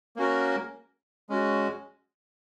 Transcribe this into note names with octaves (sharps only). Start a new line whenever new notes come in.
A#3 C#4 F#4 A#4
G#3 C#4 F#4